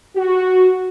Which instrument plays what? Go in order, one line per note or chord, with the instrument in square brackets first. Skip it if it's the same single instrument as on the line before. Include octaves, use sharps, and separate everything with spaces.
[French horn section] F#4